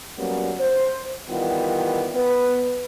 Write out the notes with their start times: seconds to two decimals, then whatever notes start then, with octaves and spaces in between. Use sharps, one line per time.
0.17 F#3 G3 A#3 B3 C#4
0.60 C5
1.30 D#3 E3 G3 B3 F4
2.15 B3 B4